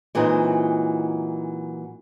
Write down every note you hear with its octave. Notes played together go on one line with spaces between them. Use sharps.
A#2 E3 F#3 G#3 C4 D#4